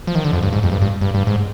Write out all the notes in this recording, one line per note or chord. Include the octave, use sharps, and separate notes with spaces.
F3
D#3
D3
F2
G2
G#2
F2
G2
G2
G2
G2
G#2